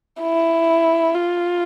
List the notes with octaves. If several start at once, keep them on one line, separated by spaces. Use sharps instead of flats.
E4
F4